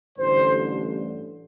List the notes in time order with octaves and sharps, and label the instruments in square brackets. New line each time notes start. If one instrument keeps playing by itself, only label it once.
[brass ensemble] A1 G2 D3 C5